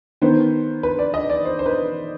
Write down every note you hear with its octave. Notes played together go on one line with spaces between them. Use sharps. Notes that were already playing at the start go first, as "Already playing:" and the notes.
D#3 B3 C5
B4
D5
D#5
D5
C5
C5
B4